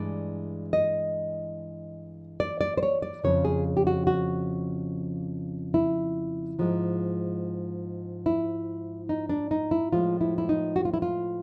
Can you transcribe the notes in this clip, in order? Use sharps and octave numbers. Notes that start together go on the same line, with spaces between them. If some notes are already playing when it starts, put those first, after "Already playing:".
Already playing: G2 E3 G#3 D5
D#5
D5
D5
C5
C#5
D5
F2 C#3 F3 C#5
G#4
G4
F#4
F#4
E4
G#2 F3 G#3
E4
D#4
D4
D#4
E4
A2 F3 G#3 F4
E4
E4
D#4
F#4
F4
E4
F4